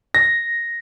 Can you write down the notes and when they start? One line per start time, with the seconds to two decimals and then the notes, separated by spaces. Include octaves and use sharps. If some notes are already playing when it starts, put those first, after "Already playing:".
0.15 A#6